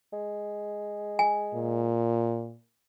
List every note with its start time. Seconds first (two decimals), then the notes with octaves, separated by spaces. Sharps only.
0.13 G#3
1.19 G#5
1.54 A#2